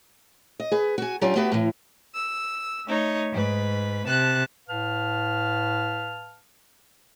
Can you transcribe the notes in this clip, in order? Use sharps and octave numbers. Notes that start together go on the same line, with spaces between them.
D#5
G#4 B4
F#4 G#5
F#3 C#4 D4 F4 G4
A3 B3 F#4 G4 B4
A2 E3
E6
A3 D#4 C#5
G#2 B4
C3 A5 F#6
A2 B4 F5 A5 F6